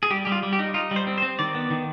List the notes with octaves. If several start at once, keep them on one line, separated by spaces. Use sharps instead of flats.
G#4
G3 G4
G3 G4
F4
G3
G4
D#4
D#4 F4
G3
C5
C4
C5
C4
D#3 D5
B3
D#3